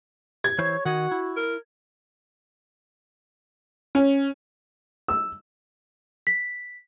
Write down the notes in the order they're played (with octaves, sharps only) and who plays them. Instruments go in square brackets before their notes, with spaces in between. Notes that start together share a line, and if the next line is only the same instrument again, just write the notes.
[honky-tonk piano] G#6
[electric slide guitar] E3 E4 C5 [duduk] C#5
[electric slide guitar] D#3 D#5 [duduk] F#4 [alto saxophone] F#5
[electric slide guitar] E4
[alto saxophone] A#4
[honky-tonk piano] C#4
[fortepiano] E6
[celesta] B6